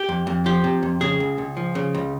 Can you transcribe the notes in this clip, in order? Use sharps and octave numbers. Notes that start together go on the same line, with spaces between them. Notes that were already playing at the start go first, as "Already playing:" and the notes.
Already playing: G4
F2
F2
F3 G4
C3
F2
C#3 G#4
C#2
C#2
F3
C#3
C#2